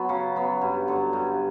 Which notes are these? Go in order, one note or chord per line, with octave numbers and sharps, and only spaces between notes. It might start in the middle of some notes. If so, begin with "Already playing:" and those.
Already playing: F#3 B3
C#3
F#3 B3
G2
D3 F#3
G2